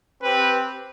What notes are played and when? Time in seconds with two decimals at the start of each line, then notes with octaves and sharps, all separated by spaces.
0.22 C4 G4 B4